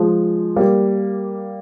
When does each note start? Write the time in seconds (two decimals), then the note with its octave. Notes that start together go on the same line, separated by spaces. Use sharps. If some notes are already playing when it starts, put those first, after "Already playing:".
Already playing: F3 G#3
0.56 G3 A#3